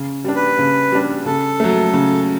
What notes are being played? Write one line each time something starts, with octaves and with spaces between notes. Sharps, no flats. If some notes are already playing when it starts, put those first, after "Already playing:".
Already playing: C#3
G3 D4
B4
C#3
G3 D4
C#3 A4
F#3 A3
C#3